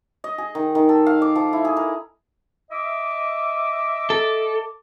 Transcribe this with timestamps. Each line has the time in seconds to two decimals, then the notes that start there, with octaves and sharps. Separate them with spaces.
0.24 D#5
0.38 G#4
0.55 D#3
0.75 D#3
0.89 A4
1.06 F5
1.22 D6
1.35 F3
1.53 E4
1.65 G#4
1.77 A#4
2.71 D#5 E5 D6
4.10 A4